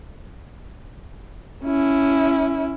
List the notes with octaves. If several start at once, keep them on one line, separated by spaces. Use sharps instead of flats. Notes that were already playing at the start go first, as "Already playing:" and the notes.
C#4 E4